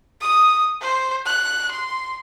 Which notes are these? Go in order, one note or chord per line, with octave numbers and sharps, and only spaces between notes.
D#6
C5
F#6
C6